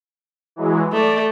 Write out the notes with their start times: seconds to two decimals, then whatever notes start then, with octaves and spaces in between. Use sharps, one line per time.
0.56 E3 F#3 G#3
0.93 A3 D5